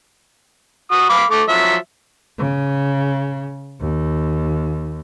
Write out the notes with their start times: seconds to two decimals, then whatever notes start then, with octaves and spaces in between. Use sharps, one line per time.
0.91 F#4 D#6
1.10 F5 B5 D6
1.31 A3 D6
1.49 F3 F#3 E5
2.38 C#3
3.80 D#2